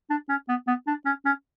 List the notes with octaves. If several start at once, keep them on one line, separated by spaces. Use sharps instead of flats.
D4
C#4
B3
B3
D4
C#4
C#4